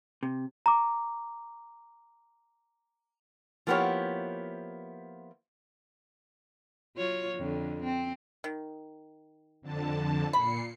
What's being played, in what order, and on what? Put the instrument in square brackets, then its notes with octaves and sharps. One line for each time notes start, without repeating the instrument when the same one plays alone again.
[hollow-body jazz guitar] C3
[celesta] A#5 D6
[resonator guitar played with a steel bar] F3 A#3 B3 E4 G4 C#5
[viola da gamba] F#3 F4 C#5
F2 D3
C4
[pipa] D#3
[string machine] F2 D3 A5
[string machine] A#2 C7 C#7 [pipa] B5